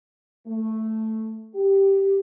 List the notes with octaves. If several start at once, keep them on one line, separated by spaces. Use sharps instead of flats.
A3
G4